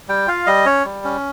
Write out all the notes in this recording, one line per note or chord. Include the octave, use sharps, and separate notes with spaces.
G3 G5
F4 F5
G3 D#5
C#4 C#5
G3
C#4